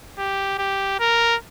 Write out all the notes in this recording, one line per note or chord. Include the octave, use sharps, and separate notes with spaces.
G4
G4
A#4